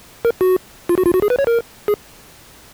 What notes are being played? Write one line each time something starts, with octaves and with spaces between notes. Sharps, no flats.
A#4
F#4
F4
F#4
F4
F#4
G#4
B4
C#5
A#4
G#4